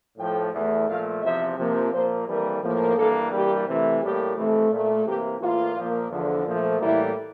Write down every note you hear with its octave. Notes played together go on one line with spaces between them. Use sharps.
A2 F3 A3 G5
E2 E3 A3
A#2 F3 A3 F5
E2 C3 F3 E5
C3 F3 A#3
A#2 F3 A#3 C5
F2 E3 G3 A#3 A#4
A2 F3 A#3
G2 E3 A#3 A4
G2 E3 G3 A#3 G4
C3 E3 A3
A2 G3 A#3 G4
F2 C3 E3 A3
A#2 A3
C3 E3 A#3 G4
A2 E3 A#3 F4
A#2 F3 A#3
E2 D3 F3
A#2 F3 A3
A2 E3 G3 A#3 E4